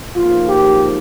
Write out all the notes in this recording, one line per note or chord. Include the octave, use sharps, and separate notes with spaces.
G#2 F3 A#3 F4
G4